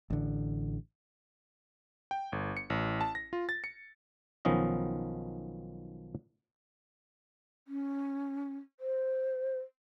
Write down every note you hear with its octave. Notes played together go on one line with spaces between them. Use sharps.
A1 D3
G5
G1
C#7
A1
A5
A#6
F4
A6
C#7
B1 D#3 F3 B3 C#4 D#5
C#4
C5